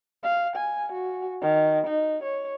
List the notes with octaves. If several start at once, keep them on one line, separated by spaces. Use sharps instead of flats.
F5
G#5
F#4
D#3
D#4
C#5